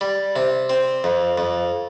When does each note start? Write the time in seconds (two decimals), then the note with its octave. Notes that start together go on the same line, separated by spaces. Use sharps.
0.01 G3
0.36 C3
0.69 C4
1.04 F2
1.38 F2